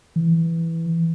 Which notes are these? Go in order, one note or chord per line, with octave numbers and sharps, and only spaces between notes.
E3